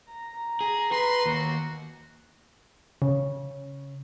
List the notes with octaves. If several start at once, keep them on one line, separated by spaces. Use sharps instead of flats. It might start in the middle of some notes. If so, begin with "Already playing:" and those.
A#5
G#4
B4 C6
D#2 F#4
C#3